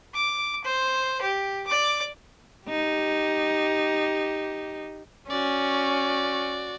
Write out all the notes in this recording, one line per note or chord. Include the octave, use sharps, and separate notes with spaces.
D6
C5
G4
D5 D6
D#4 G4
C#4 F#4 D5